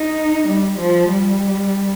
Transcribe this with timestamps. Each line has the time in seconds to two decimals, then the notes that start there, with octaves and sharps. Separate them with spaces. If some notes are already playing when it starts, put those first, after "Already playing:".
Already playing: D#4
0.47 G3
0.78 F3
1.11 G3